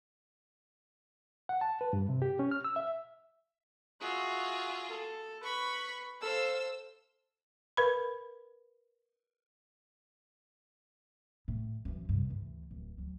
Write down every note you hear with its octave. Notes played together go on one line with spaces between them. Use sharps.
F#5
A5
B4
G2
C3
G4
C#4
F6
E6
E5
F4 F#4 G#4 E5
A4
B4 B5 C#6
A4 C5 F5 E6
A#4 B4 B5
A2
F#2 E3
G2 C3
D2 E3
D1
D2 F#3